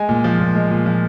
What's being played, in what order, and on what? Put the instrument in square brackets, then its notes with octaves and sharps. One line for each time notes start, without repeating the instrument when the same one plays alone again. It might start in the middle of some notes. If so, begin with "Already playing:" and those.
Already playing: [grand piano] G#3 G#5
A#2
F3
A#2
G#3
A#2
F3